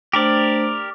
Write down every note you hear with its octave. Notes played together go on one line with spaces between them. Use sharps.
A3 D4 G4 A#4 C5 D5